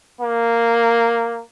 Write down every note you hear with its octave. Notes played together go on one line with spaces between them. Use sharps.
A#3